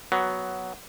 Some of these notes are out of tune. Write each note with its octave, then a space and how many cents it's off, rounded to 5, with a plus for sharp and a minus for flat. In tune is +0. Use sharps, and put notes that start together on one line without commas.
F#3 +5 B3 +0